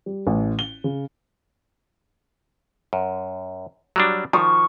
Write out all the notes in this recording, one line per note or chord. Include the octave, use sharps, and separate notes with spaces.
G3
A1
G7
C#3
F#2
F#3 G3 D4
D#3 F3 C#6